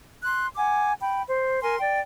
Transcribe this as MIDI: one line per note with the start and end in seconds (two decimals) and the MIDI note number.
0.23 0.47 84
0.23 0.47 90
0.57 0.91 78
0.57 0.91 80
0.57 0.91 86
1.00 1.22 79
1.00 1.22 83
1.27 1.61 72
1.61 1.79 70
1.61 1.79 80
1.61 1.79 84
1.79 2.00 74
1.79 2.00 79